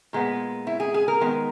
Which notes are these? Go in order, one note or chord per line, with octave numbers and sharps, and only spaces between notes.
A#2 G#3 B3
E4
G#4
G#4
A#4
D#3 G#3 B3